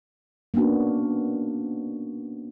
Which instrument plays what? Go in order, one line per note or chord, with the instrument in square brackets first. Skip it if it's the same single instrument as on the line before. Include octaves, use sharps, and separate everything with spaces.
[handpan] A#3 B3 C#4 D4 F#4